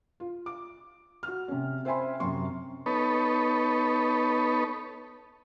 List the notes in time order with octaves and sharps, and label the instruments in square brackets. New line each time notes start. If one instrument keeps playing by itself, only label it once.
[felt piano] F4
D6
F#4 F6
C3 C#4
C5 E5 G5 G#5 B5 C6
F#2 C3 C6 C#6
[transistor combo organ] B3 D#4 A4 B4 C#5